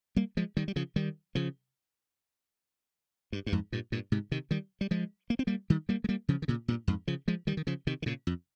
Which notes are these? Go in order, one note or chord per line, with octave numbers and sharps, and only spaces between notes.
G3 A#3
F3 G#3
D#3 G3
G3
C#3 F3
D#3 G3
C#3 F3
G2
G2
F2 G#2
G2 A#2
G2 A#2
G#2 C3
C3 D#3
D#3 G3
G3
F3 G#3
A#3
C4
G3 A#3
D#3 G3
G3 A#3
G#3
G3 A#3
C#3 F3
D#3
A#2 C#3
G2 A#2
F2 G#2
C#3 F3
F3 G#3
D#3 G3
D#3
C#3 F3
C3 D#3
D#3
A#2 C#3
F2